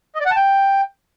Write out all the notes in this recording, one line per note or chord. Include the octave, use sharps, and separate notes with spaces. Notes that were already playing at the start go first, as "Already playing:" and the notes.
D#5
D5
F#5
A5
G5